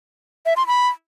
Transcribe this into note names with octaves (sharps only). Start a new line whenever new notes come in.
E5
C6
B5